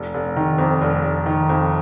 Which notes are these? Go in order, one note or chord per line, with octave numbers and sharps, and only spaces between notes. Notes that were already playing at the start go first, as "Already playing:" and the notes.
Already playing: F1
F1
D#3
F2
F1
F1
D#3
F2